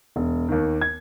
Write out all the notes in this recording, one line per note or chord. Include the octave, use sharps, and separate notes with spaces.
E1
D#2 D#3
G#6